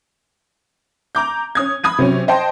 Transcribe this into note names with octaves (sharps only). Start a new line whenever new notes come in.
A#5 D6 G6
C#4 D#6 G#6
B5 D#6 G#6 D#7
C3 F#3 C#4
C5 D#5 G5 A5 C6